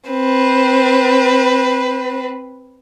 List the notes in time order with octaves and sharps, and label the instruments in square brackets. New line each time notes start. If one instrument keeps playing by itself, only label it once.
[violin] C4 B4